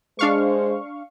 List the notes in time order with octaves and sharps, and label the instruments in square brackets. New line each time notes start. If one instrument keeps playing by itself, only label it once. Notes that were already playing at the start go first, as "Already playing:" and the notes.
[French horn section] G#3 C5 [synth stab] D4 F5 C#6